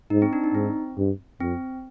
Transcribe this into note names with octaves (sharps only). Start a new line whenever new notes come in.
G#2 D#4
C4
D4
D#4
G#2 C4
G2
F2 C4